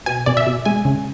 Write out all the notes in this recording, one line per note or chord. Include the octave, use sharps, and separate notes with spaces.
B2 G#5
B2 D5
E5
B2
G#3 G#5
C#3